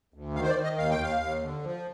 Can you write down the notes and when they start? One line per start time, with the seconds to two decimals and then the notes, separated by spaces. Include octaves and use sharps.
0.14 D2
0.35 D#3 F5
0.43 C5
0.50 D5
0.56 D#3
0.64 D#5
0.78 D#2 F5
0.90 G5
0.99 D#2 F5
1.21 D#2
1.42 D3
1.63 F3